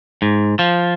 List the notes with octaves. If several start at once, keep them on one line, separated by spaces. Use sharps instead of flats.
G#2
F3